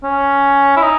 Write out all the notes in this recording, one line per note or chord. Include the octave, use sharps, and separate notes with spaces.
C#4
E4
D#4